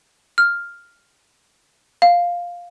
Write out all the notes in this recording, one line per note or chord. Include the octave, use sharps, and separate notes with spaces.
F6
F5